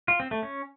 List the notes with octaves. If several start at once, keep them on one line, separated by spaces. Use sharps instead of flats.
F4
C4
A3
C#4